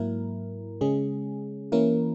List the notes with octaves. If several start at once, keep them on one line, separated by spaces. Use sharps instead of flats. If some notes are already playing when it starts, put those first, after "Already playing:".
Already playing: G#2 F#3 A#3 E4 A#4
C#3 G#3 C#4 G#4
E3 A#3 C#4 E4 A#4